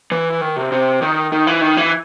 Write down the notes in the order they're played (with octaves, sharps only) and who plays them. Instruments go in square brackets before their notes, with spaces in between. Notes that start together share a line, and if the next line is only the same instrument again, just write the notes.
[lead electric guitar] E3
D#3
C3
C3
D#3
D#3
E3
D#3
E3